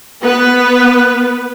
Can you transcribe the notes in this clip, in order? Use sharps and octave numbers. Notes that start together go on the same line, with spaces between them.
B3 B4